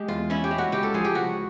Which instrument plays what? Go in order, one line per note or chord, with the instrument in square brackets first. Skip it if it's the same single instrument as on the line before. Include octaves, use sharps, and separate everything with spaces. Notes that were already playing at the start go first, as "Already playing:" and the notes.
Already playing: [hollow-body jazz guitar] G#3 [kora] G4
[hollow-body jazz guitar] E2 [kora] F4
[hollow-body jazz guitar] C#4 [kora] E4
[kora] G4
[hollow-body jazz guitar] G#3
[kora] F#4
[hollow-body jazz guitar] C#2 [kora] G4
[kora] A4
[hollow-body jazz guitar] F3 [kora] G#4
[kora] G4
[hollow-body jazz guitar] C#2 [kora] F#4